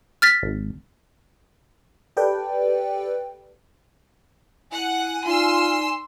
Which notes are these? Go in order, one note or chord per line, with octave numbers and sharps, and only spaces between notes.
F6 A6 B6
G#1
G4 A4 B4 D5 G5
E4 F#5 G#5
D#4 F4 D5 C6 E6